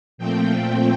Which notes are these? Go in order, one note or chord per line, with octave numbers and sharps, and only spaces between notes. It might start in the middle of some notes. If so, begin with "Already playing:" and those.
A#2 F3 A3 C4 G5